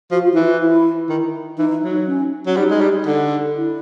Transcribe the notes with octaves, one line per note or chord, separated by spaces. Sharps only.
F3 F#4
F4
E3 E4
F4
E4
D#3
E3 D#4
F#3
C#4
F#3
G3 D#4
G#3
G3
D3
E4